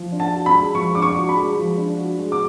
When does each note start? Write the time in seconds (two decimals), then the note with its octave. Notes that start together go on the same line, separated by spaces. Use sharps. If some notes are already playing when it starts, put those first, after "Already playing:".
Already playing: F3
0.12 D4
0.20 A5
0.33 F#4
0.46 B5
0.54 G#3
0.75 F3 C#6
0.95 D4 D6
1.02 C#6
1.16 F#4
1.29 B5
1.36 G#3
1.57 F3
1.77 D4
1.98 F#4
2.19 G#3
2.32 D6